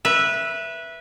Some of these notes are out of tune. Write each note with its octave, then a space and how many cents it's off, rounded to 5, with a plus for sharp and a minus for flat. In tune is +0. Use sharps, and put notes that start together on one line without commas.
B4 -15 E5 +10